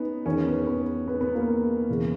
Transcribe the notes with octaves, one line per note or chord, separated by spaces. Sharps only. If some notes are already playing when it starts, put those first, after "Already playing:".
Already playing: B3 C#4 D#4
E2 D#3 C#4
B3
B3
B3
B3
A#3
E2 C#3 E3